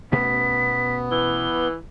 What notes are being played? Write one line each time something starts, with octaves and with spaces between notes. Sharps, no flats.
B2 A3 B3 C#4 B6
E3 G7